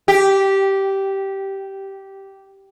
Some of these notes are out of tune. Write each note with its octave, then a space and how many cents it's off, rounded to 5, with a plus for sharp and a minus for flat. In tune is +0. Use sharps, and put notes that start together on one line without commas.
G4 -10